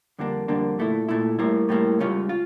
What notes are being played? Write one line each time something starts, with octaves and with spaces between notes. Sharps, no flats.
F2 D3 G3 A#3 D4
F2 D3 G3 A#3 D4
A#2 A3 E4
A#2 A3 E4
A2 G3 A#3 E4
A2 G3 A#3 E4
C#2 C#3 G3 C#4 F4
F4